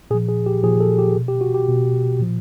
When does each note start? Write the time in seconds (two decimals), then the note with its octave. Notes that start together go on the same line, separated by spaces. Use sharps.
0.11 A#2 G#4
0.14 F3
0.28 G#4
0.46 G4
0.63 A#2 F3 G#4
0.80 A4
0.98 G4
1.16 B2
1.28 G4
1.41 F#4
1.54 G4
1.68 B2
2.20 A#2 F3